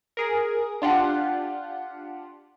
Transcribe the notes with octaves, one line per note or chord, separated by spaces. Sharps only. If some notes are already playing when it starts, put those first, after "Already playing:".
G#4 A#4
D4 F4 G4 F#5